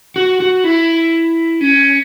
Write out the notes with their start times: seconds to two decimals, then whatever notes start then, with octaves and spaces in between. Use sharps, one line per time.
0.16 F#4
0.40 F#4
0.64 E4
1.61 C#4